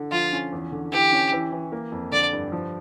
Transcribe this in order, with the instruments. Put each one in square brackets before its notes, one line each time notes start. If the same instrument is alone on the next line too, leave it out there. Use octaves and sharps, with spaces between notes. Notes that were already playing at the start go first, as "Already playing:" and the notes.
Already playing: [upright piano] D3
[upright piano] F3 [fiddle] F4
[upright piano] C#4
E2
D3
[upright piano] E3 [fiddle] G4
[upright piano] C#4
E3
E3
A#3
F2
[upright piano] D3 [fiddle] D5
[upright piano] G2
F3